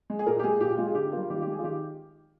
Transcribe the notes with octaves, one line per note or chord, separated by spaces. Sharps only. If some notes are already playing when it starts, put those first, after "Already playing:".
G#3
G#4
A#2 A#4
G4
G#3 G#4
A#2 G4
G#3 F4
G#4
D3 G4
G3 A#3 F4
D#3 G4
F4
G4
G#3
G#4
F4
D#3 G4